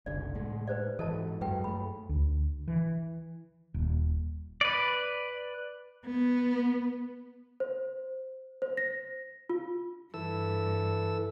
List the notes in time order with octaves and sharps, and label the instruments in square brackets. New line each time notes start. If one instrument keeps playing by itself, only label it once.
[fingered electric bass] F#1 C2 D3 [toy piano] D5
[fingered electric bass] A2 G#3
[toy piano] B4 C5 D5
[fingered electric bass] G#2 E3 [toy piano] A4 D#5 A5
[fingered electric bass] F#2 F#3 G#3 [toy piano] B4 G5
[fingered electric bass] G2 A3 [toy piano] B5
[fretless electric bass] D2
E3
D#1
[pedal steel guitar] B4 D5
[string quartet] B3
[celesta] C5
C5
A#6
F4
[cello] G2 [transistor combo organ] E3 A4 E6